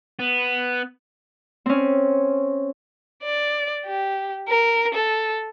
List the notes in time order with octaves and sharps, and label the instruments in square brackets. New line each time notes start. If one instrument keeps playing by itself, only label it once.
[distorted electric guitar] B3
[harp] C4 C#4
[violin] D5
G4
A#4
A4